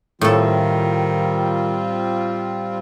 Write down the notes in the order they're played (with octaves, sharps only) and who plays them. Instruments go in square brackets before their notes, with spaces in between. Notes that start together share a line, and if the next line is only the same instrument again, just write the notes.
[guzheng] A2 A4 [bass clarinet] D#3 [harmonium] G3 C4 F4